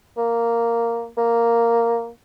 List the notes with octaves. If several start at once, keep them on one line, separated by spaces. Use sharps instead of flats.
A#3
A#3